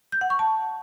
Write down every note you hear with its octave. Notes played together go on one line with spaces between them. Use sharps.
G6
F#5
C#6
A5